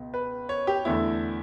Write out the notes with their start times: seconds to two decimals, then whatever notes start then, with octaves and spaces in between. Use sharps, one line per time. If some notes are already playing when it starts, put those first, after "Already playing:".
Already playing: C#2 B2
0.14 B4
0.49 C#5
0.67 G4
0.85 E2 D3 A3 E4